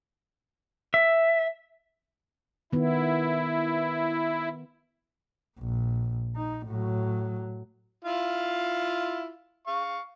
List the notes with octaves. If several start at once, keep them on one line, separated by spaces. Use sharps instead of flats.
E5
D#3 B3 E4
A#1
D#4
A2 F#3
E4 F4 F5
F5 C#6